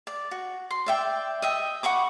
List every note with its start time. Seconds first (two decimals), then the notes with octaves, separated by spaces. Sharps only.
0.07 D5
0.31 F#4
0.71 C6
0.86 D5 E5 G5
1.42 D#5 E5 G5
1.83 F#5 B5 C#6 D6